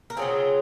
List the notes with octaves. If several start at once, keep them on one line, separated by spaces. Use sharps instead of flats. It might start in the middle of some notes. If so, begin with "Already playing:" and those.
A#4
C#3 F#3 C4 F4 G#4